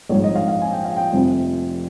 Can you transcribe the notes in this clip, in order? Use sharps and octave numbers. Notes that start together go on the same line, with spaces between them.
A#1 G#2 F3 C#5
D#5
F5
F5
G#5
G5
F5
G5
F1 F2 C3 F3